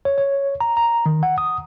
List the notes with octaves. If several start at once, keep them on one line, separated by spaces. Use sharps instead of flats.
C#5
C#5
A#5
A#5
D#3
F#5
D#6